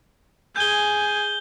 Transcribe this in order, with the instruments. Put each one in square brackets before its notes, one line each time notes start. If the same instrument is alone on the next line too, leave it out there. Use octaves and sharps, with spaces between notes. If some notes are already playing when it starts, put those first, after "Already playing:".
[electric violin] G#4 G#5 [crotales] G6 G7